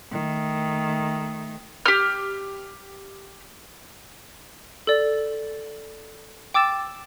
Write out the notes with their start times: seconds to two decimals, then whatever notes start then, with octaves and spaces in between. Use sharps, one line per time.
0.12 D#3 A3
1.86 G4 F6
4.87 A4 D5
6.54 G5 D6 E6 A6 E7